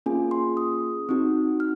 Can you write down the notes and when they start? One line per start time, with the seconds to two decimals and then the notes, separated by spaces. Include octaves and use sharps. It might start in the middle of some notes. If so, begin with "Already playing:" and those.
0.06 A#3 C#4 F4 G#4 G#5
0.31 C6
0.57 D#6
1.09 C4 D#4 F#4
1.60 F6